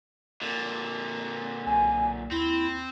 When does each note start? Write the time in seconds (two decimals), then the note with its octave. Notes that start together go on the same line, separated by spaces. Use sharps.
0.42 A#2 D3
1.66 B1 G#5
2.31 D#2 C4 E4